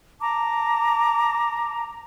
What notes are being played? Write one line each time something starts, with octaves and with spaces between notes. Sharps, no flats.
A5 A#5 D6